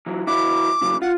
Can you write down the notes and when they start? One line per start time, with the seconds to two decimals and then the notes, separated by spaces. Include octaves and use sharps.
0.06 E3 F#3
0.27 E3 E4 F#4 D6
0.82 C#3 E3 F#3
1.02 F4 F#5